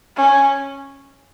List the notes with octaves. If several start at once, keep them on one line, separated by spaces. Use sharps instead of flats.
C#4